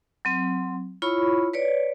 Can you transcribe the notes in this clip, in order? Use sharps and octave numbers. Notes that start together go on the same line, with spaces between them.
F#3 C4
E4 F4 C#5 B5 C#6
B4 C#5 D5